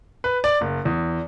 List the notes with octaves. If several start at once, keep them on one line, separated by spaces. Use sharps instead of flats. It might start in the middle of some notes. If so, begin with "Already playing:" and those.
B4
D5
F#1
E2